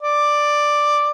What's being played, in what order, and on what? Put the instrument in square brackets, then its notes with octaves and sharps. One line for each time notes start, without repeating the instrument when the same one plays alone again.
[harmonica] D5